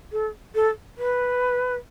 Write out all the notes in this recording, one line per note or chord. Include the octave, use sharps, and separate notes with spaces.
A4
A4
B4